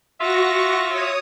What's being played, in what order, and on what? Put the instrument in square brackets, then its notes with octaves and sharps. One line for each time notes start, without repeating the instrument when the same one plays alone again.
[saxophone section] F4 E5 [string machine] F#4 C#6 A#6
[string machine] C#5 D#6